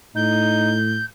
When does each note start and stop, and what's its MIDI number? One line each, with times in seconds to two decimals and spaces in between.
0.16 1.01 45
0.16 0.78 63
0.16 1.05 91